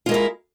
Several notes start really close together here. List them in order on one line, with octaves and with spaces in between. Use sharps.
F4 G#3 A#4 E4